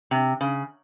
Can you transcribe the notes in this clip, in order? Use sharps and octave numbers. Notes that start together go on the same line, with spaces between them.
C3
C#3